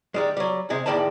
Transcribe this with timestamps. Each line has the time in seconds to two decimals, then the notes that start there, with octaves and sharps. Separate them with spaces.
0.14 D#3 G3 G#3
0.37 F#3 G3
0.70 C3 G#3 G#4
0.86 E2 A2 D#3 G3 B4 A5